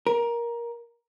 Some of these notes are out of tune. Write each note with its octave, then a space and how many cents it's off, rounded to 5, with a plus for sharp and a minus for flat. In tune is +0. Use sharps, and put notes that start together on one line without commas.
A#4 +15